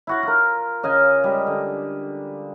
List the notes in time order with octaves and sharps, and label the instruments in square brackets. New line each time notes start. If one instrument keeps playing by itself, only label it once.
[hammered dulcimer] E4 F#4 F#5
F4 A#4
C#3 D#5 F5 G#5
G3 G#3
D3